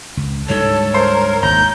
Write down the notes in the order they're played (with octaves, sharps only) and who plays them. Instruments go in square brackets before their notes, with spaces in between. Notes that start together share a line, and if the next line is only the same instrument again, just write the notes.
[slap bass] C#2
[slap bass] D2 G#2 G3 [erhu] A4 [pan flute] C#5
[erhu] A#4 [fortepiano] C5
[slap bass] G#1 D#2 [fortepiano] A#5 [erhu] G6